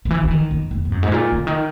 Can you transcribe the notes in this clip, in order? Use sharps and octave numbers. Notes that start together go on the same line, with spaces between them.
D#3
E3
E3
D#3
E2
E2
G#2
F#2
G#2
A#2
C#3
D#3